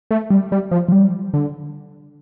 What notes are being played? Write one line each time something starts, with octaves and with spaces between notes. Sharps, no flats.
A3
G3
G3
F3
F3
G3
D3